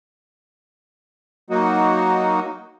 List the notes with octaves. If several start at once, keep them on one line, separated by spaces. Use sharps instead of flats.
F#3 A#3 D#4 F#4